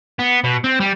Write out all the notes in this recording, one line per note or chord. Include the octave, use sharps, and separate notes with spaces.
B3
B2
C4
G3